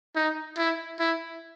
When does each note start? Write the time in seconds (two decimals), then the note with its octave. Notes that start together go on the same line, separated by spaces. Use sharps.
0.16 D#4
0.58 E4
1.00 E4